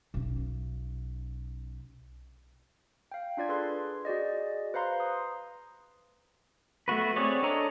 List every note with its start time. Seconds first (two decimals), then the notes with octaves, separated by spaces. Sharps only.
0.14 B1 C#4
3.12 F5 G5
3.37 D4 F4 D5 G#6
3.49 G#4 A4 B4 C6
4.05 F#4 G#4 D5 D#5
4.74 B4 C5 F5 A#5 C6
5.00 D#6
6.88 A3 B3 F#4 B4
7.16 C4 G#4 C#5 D5
7.43 D4 A4 C#5 D#5 A#5